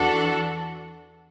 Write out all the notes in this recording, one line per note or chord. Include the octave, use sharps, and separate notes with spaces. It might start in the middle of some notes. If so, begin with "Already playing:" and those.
Already playing: E2 E3 D4 F#4 A4